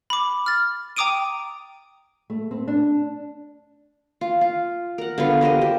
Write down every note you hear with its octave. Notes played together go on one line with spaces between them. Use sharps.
B5 D6
F6 A6
G5 A#5 D6 D#6 D7 D#7
A3
C4
D4
F4
F4
A#4 F#5
D3 B3 F4
G4 A#4 C5 D#5
G4